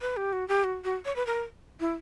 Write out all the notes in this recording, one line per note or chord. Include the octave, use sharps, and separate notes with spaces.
B4
G4
F#4
G4
F#4
F#4
C#5
B4
A#4
E4